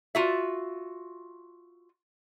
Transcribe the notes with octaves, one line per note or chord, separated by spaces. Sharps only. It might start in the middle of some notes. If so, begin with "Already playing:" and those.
F4 F#4 E5